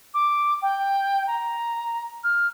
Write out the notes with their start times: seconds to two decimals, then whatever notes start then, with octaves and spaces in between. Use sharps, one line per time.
0.14 D6
0.62 G5
1.27 A#5
2.23 F6